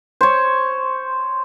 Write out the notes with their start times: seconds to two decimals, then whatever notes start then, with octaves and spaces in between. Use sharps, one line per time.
0.21 C5 C#5